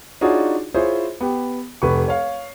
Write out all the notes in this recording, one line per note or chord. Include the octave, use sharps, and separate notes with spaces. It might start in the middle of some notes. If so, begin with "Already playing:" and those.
D4 D#4 F4 F#4 G#4 C#5
E4 F4 G#4 C5 C#5
B3 G4
F1 B4 C#6
C#5 F5